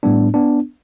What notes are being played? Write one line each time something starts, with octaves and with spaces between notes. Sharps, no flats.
A2 G3 B3 D4
B3 D4